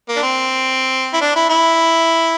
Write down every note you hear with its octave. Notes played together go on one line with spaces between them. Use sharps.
A#3
D4
C4
E4
D4
E4
E4